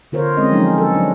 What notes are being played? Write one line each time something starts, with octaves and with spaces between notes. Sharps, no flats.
D3 F4 A#4 C5 C#5
G#3 C4 C#4 D#5
F3 F#3 G#3 C#4 D#4
A4
F#3 D4